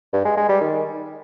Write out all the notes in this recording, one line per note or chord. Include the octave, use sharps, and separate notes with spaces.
G2
G#3
G#3
G3
D#3